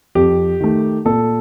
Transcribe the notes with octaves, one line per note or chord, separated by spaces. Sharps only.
F2 G4
D#3 A3
A#2 A4